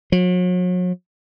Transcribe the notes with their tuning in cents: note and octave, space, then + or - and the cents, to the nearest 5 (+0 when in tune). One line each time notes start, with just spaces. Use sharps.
F#3 -40